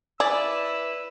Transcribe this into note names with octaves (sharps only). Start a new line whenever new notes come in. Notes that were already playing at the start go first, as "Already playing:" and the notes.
E4 G#4 B4 D5 E6